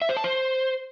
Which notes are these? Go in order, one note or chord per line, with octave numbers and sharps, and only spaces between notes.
E5
C5
A5
C5